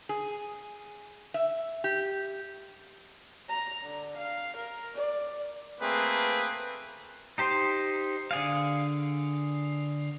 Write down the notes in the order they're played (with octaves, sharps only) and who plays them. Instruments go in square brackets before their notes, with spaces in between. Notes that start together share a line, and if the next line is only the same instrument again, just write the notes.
[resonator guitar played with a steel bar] G#4
E5
G4
[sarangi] A#5
D3
F5
A#4
D5
[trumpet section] A3 A#3 C4 G#4 B4
[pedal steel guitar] D#4 G4 C5
D3 G#4 F5